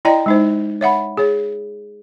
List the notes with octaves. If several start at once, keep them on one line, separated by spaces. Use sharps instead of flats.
E4 D5 D#5 G5 A#5
G#3 D#4 C5
C#5 E5 F#5 B5
G#4 C#5